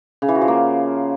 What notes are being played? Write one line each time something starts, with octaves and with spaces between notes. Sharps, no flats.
C#3
E3
F#4
F3
A#3